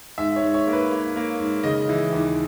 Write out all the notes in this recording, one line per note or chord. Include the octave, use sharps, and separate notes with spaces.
G#2 E5
C#5
G#2
C#5
A#3
B4
A#3
A#3
G#2
C#3 D#5
E3
D#2